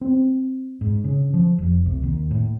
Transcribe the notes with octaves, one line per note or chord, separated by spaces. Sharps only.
C4
G#2
C#3
F3
F1
C2
D#2
A2